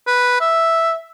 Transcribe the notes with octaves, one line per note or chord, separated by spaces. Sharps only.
B4
E5